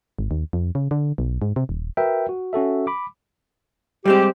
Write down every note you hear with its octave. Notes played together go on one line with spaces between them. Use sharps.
G#1
D#2
F2
C#3
D3
B1
G#2
C3
D#1
F#4 A#4 B4 E5 G5
F#4
C#4 F#4 A4 E5
B5 D6
G3 G#3 C4 G4